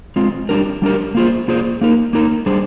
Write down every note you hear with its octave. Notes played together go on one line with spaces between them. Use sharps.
G#3 C4 F4
G3 D4 G4 A#4
G3 D4 G4 A#4
A#3 F4 G#4 C5
A#3 F4 G#4 C5
A#3 D#4 A#4
A#3 D#4 A#4
G3 D4 G#4 C5